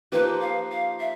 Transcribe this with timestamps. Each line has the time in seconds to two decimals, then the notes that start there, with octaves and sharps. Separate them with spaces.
0.12 F3 A#3 D#4 G4 B4
0.41 F5
0.71 F5
1.00 E5